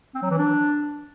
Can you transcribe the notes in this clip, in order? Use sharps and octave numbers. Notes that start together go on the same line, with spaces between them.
C4
F#3
E3
D4